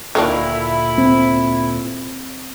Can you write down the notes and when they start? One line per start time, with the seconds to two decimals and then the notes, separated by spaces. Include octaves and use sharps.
0.15 D2 A#2 D#3 A#3 D4 E4 A#5
0.98 C4